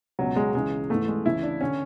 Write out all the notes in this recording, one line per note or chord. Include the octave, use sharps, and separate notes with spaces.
C#2 B2 F#3
G#3
C#2 C#3 E3 G#3
G#2 E3 A3
G#3
C#2 C#3 E3 E4
D4
D3 C#4